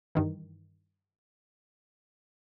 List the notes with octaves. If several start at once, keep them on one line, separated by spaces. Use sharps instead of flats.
G2 D#3 E3